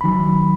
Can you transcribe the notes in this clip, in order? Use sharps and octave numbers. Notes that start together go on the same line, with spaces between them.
D#3 F#3 B5